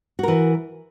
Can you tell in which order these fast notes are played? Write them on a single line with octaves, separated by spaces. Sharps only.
F#4 A#4 E3